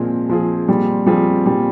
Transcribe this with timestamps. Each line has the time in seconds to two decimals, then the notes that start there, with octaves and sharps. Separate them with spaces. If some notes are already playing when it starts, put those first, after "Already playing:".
Already playing: A#2 F3 G#3 C4 F4 G#4
0.29 F3 C4 F4 G#4
0.68 A#2 G3
1.06 F3 G3 C4 F4 G#4
1.46 A#2 G3